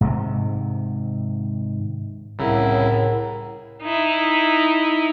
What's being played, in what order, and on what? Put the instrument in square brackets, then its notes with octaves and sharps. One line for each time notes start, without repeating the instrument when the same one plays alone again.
[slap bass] G#2 C3 D#3
[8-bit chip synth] C2 C#3 E4 [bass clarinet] A2 [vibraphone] A#4 F#5 A#5
[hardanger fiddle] D#4 E4